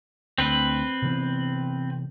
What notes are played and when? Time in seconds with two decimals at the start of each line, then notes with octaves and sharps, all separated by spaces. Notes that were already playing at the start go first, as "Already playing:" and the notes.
0.38 D2 C4 B4
1.02 C3 E3 B3